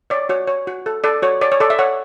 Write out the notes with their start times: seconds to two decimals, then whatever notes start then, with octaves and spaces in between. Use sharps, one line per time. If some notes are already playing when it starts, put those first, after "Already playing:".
0.10 C#5 D5
0.29 F#4 C#5
0.47 C#5
0.67 F#4
0.86 A4
1.04 A4 D5
1.22 F#4 C#5
1.41 C#5 D5
1.52 C#5
1.60 A4 D5
1.70 E5
1.79 C#5 F#5